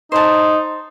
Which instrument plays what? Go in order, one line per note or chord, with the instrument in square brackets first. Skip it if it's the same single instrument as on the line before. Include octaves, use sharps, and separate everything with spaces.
[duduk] D#4 [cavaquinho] C5 A5